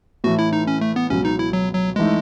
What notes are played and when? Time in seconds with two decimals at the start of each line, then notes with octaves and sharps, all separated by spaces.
0.24 A2 E3 A3 F#4
0.39 E4
0.53 D#4
0.67 C#4
0.81 A3
0.96 B3
1.10 C#2 B2 F#3 C#4
1.25 D#4
1.39 E4
1.53 F#3
1.75 F#3
1.96 E3 G#3 A3 D#4